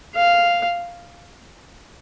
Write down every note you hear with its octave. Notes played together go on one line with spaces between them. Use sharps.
F5